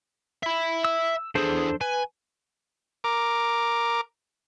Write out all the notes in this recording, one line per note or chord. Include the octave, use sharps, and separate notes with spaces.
E5 B5
E6
E2 D4 G#4 A4 C5
B4 G#5
A#4 D6